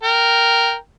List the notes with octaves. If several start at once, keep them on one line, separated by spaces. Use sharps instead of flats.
A#4 G5